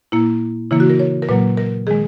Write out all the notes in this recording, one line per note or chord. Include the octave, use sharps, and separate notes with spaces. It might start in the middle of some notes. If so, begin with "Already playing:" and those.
A#2 A#3 E4
C#3 E3 A#3 E4
F#4
A#4
C#5
A#4
A#2 F#3 A#3 B4
A#4
D#3 G#3 G#4